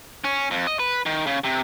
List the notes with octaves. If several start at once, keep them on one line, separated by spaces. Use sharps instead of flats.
C#4
F2
D#5
B4
D#3
C#3
C3